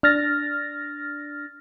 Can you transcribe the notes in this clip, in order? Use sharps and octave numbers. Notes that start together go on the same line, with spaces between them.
D4 F6 A6 A#6